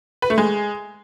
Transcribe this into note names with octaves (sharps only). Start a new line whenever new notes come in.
B4
A3
G#3